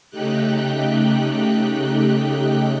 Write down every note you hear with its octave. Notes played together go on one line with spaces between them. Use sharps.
C#3 A3 D#4 G4 G5 F#6